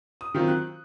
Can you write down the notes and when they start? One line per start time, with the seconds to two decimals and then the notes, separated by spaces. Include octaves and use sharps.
0.21 D#6
0.34 D#3 F#3 C4 F4
0.48 F#6